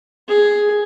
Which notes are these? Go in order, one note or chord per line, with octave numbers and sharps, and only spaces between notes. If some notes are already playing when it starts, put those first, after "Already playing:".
G#4